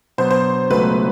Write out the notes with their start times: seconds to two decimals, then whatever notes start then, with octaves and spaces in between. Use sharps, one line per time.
0.18 B2 F#3 B3 C5
0.31 C5
0.70 C#2 B2 F#3 A3 B4